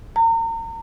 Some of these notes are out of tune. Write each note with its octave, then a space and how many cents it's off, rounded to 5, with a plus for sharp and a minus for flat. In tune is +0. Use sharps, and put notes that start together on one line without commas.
A#5 -35